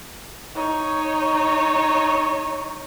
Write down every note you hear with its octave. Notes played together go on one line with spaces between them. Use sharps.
D#4 C#5